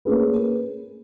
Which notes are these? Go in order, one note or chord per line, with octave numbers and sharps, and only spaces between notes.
A#3 C#4 G#4 B4